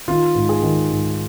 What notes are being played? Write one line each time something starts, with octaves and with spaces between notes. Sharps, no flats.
D#3 F4
G#2
G#4
D#3
G#2